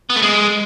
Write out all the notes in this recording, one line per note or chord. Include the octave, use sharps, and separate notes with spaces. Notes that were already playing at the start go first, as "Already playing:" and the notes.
B3
A3
G#3